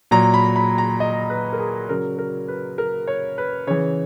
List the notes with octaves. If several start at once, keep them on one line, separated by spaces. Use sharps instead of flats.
A#2 F#3 A#5
B5
B5
A#5
D#5
B4
A#4
G#4
C#3 F#3 A#4
A#4
B4
A#4
C#5
B4
C#3 E3 C#5